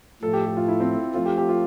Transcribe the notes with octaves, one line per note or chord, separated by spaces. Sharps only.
A2 F3 A3 A4
G4
G4
F4
E4
C4
F3 A3 C4 F4
G4
G4
F4